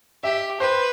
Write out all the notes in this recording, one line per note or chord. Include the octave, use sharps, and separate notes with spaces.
G4 E5
B4 C5